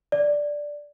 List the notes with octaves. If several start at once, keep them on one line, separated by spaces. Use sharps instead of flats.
D5